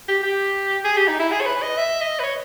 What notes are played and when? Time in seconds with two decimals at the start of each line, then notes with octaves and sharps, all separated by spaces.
0.08 G4
0.23 G4
0.84 G#4
0.97 G4
1.08 D#4
1.19 E4
1.32 G#4
1.41 C#5
1.46 B4
1.62 D#5
1.77 E5
2.01 D#5
2.20 B4
2.23 C#5